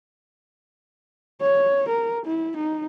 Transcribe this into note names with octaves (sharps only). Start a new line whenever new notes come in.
C#5
A#4
E4
D#4